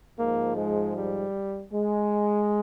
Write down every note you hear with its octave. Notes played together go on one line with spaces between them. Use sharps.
G#2 F3 A#3
G#3
G3
G#3